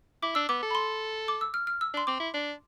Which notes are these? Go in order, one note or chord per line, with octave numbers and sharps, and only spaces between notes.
E4 D6
D4 E6
B3 D6
A4
B5
C6
D6
E6
F6
F6
E6
D4 C6
C4 D6
E4
D4